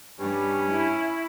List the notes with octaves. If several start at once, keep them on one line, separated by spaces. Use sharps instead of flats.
G2 G3 C#4
E4